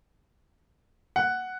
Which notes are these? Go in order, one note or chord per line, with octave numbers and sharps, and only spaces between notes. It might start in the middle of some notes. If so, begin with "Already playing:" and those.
F#5